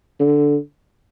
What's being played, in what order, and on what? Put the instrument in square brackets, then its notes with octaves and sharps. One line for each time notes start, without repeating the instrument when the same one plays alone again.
[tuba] D3